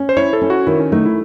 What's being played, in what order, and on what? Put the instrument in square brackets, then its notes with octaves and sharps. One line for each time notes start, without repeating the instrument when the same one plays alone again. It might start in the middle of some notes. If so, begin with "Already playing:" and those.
Already playing: [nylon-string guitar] C#4
[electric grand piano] C5
[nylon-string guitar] E4 [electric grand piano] C#5
[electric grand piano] A4
[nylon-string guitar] C#4
[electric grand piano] F#4
[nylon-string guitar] D#3 [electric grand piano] E4
[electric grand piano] C#4
[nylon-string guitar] A3 [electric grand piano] D#4
[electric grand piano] E4